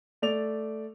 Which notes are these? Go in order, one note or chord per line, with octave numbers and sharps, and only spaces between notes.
A3 D5 F7